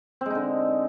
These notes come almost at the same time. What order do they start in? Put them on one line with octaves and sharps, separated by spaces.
C4 G#3 D#4 D3